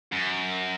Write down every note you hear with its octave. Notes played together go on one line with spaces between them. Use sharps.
F#2